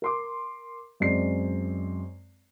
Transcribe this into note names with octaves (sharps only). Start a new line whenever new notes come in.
A#4 C6 D6
F#2 G#3 C4 D5 C7